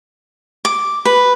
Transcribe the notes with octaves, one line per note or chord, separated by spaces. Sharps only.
D6
B4